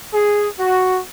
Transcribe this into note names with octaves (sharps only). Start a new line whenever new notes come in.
G#4
F#4